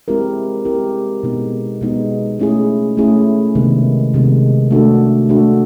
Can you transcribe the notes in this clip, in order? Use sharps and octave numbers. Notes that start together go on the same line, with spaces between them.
G#3 C4 E4 G4 A#4
G#3 C4 E4 G4 A#4
B2 G#3 B3 D#4
B2 G#3 B3 D#4
A3 C#4 E4 G#4
A3 C#4 E4 G#4
C3 D#3 G#3 B3
C3 D#3 G#3 B3
A3 D4 F#4 A4
A3 D4 F#4 A4